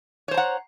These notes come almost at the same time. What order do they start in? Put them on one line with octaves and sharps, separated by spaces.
C#5 C5 A#5 F#5